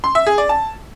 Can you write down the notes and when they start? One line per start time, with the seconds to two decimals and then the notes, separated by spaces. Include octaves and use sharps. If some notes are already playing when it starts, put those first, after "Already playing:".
0.04 C6
0.15 E5
0.27 G#4
0.38 D5
0.49 A5